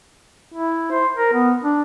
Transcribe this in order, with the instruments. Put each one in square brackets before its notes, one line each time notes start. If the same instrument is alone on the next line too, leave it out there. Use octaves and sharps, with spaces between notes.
[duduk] E4
C5
A#4
B3
D4